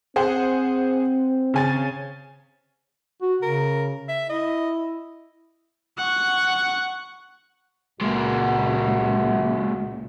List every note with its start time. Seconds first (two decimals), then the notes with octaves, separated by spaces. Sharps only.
0.16 C4 G#4 C5 F#5
1.54 C#3 G#5 A6
3.22 F#4
3.42 C#3 A#4
4.09 E5
4.29 E4 D#5
5.98 F#5 C#6
8.01 C#2 A#2 G#3 A#3 F#4